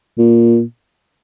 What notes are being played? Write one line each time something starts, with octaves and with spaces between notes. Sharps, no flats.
A#2